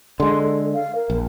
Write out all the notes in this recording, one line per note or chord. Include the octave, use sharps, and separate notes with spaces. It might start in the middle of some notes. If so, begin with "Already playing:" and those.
D3 G#3 C6
A4
F5
A#4
A#1